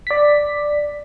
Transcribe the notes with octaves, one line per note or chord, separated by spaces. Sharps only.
D5 B6